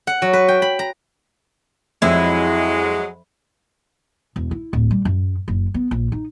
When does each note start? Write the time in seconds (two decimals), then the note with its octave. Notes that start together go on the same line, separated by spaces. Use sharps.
0.07 F#5
0.22 F#3
0.33 B4
0.48 G5
0.62 B5
0.79 A#5
2.02 F2 F#3 G#3 E4
4.36 E1
4.51 E4
4.73 D1
4.91 G3
5.05 F#2
5.48 F#1
5.74 B3
5.91 A#1
6.12 D#4